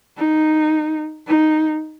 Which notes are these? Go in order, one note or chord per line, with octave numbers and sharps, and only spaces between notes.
D#4
D#4